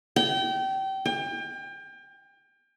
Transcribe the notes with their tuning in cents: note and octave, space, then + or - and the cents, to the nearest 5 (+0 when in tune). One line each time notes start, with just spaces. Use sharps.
G5 -25
G5 +35